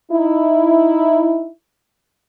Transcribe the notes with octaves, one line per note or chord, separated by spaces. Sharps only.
D#4 E4